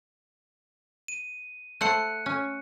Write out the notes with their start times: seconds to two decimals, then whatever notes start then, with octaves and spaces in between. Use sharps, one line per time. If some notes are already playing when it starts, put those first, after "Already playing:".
1.08 D#7
1.81 A3 C5 F#5 F#6 C#7
2.26 C#4